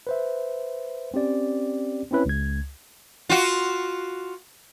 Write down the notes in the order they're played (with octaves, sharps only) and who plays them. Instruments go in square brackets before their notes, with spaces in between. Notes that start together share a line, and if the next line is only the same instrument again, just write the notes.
[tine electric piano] B4 C5 E5
C4 C#4 G4 D5
C4 C#4 E4 B4 C#5
C#2 G#6
[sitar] F4 F#4